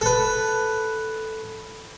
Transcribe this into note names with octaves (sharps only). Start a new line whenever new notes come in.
A4 B4